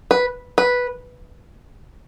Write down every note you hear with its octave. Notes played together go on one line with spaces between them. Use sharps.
B4
B4